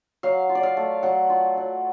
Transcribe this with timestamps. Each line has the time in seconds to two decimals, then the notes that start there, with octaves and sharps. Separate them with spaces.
0.23 F#3 F5
0.49 F4
0.55 D5
0.63 F5
0.77 A3
1.03 F#3 F#5
1.30 F4
1.57 F#3